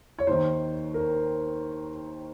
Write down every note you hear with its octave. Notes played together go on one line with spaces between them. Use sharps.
C#5
D#2 D#3 C5
A#4